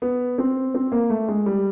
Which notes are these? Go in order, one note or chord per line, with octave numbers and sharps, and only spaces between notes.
B3
C4
C4
A#3
A3
G#3
G3